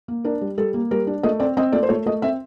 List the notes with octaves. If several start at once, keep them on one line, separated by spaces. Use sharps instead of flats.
A#3
D4 A#4
G3
G3 A4
A#3
G3 A#4
D4
A3 D#5
C4 D5
C4 D#5
A3 D5
C5
A3 C#5
A3 D#5
C4 E5